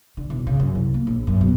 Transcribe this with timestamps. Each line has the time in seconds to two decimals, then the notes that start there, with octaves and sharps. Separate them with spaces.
0.17 D3
0.30 E1
0.47 C#3
0.60 F#2
0.75 C2
0.94 A#3
1.07 A#1
1.27 F#2
1.41 B2